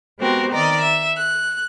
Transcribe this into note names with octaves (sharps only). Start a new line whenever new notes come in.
G#3 B3 C4 F#4 G4 A#4
D#3 D5 D#5 A#5
E5
F#6